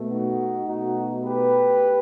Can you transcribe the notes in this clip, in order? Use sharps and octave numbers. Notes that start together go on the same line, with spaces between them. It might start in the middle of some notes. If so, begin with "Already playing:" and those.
Already playing: B2 A3
D#4 F#4
B2 A3 D#4 F#4
G4 B4